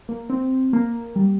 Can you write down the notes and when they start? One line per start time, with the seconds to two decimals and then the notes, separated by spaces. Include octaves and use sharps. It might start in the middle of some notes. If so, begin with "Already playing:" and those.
0.09 A#3
0.29 C4
0.73 A#3
1.16 G3